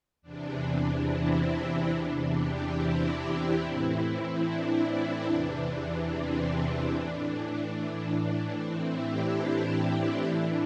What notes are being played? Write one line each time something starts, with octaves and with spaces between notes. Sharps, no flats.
E2 C3 E3 D4
C4 E4
D4
E2 C3 E3 D4
D4 G4
C4 E4
A2 E3
D4
E2 C3 E3 D4
C4
D4
A2 E3 D4
A2 E3 C4 E4
D4 G4
D4
A2 E3